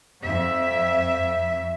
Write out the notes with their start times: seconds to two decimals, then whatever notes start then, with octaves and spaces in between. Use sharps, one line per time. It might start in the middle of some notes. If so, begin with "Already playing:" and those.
0.22 F2 E5